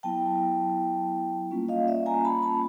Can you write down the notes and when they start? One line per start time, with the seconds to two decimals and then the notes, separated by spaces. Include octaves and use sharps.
0.03 F#3 B3 E4 G5 A5
1.51 G3 A#3 C#4 F4
1.69 D#5 F5
1.88 D5 E5
2.06 G#5 A#5
2.25 A5 B5
2.42 A5 B5